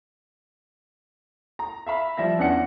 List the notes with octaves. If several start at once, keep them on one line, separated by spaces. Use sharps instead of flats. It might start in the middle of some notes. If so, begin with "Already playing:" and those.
A#5
E5 F5 B5
F3 G3 E5 A#6
E2 C#4 D4 F#5 C#7